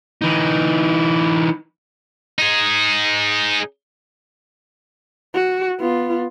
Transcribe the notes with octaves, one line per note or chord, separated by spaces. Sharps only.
E3 D#4
D#4 G#4
F#4
B3 F4